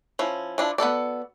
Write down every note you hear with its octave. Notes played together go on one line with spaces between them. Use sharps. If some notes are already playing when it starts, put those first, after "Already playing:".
F3 C#4 E4
F3 D4 E4
B3 F#4 A4 D5